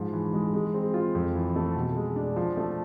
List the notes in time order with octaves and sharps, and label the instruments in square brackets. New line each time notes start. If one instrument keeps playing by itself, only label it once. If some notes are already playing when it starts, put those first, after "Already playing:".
Already playing: [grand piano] G#2 F3
E3
G#3
G#3
C4
F4
F2
E3
A3
B2
G#3
D4
F3
A3